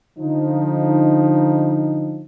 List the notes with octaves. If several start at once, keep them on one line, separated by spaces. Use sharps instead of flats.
D3 F3 D#4